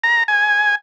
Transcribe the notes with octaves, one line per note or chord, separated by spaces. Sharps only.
A#5
G#5